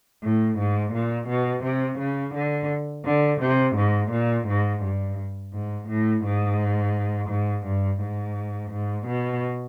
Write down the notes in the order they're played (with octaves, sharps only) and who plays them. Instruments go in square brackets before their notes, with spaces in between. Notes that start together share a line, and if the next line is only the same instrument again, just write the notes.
[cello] A2
G#2
A#2
B2
C3
C#3
D3
D3
C3
G#2
A#2
G#2
G2
G#2
A2
G#2
G#2
G2
G#2
G#2
B2